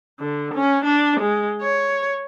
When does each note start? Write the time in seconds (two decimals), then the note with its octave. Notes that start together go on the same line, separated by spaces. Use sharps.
0.20 D3
0.54 C#4
0.84 D4
1.20 G#3
1.62 C#5